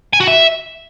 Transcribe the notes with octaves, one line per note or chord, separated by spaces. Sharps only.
G#5
F#4
E5